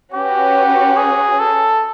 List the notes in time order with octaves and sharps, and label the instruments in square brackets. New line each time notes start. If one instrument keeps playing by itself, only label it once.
[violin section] C#4 F#4 B4 [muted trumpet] G4
[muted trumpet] G#4
A4